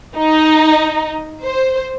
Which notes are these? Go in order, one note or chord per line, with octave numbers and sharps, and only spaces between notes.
D#4
C5